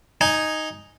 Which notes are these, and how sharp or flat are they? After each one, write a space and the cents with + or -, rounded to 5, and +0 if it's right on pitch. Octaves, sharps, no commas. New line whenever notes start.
D#4 +0 G#5 +0